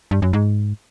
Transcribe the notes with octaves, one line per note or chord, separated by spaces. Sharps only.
G2
F#2
G#2